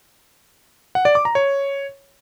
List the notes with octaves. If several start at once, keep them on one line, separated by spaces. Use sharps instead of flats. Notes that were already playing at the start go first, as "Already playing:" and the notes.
F#5
D5
D6
A#5
C#5